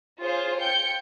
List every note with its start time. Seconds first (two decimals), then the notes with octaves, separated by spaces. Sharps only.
0.20 F4 G#4 C5 C#5
0.58 G5 G6 C#7